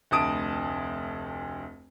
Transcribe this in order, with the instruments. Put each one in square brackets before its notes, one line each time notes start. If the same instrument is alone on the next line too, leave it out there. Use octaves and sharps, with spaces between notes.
[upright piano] F1 D2 A5 D#6 D7